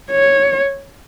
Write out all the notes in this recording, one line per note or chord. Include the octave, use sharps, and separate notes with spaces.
C#5